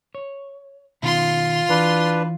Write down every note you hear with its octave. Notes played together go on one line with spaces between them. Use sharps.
C#5
B2 D#3 F4 C6
E3 D4 B4